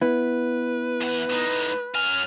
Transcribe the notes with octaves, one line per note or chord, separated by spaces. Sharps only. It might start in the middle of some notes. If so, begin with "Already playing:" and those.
B3 E4 B4
E2 F#5
A2 D#4
F#2 G#5 F6